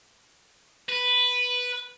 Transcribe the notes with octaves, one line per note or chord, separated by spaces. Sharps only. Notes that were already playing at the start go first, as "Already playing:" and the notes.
B4